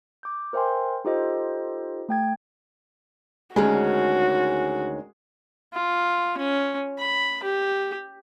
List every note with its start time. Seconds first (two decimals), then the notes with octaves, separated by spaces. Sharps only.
0.23 D6 G6
0.53 A#4 C5 E5 G5 G#5 C6
1.05 D#4 F4 G4 A4 C5 D#5
2.09 A3 G5 G#6
3.56 D2 D#3 G#3 C#4 F#4
5.73 F4
6.37 C#4
6.98 B5
7.43 G4